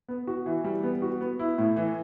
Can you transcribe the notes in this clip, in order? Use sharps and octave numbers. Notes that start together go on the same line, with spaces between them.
B3
F#4
E3
G3
B3
F#4
B3
E4
A2
E3